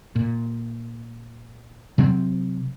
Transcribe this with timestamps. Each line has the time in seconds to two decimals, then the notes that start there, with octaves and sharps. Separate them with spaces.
0.16 A#2
1.98 C3 F#3 C4